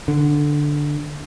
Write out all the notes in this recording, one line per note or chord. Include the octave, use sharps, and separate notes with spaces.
D3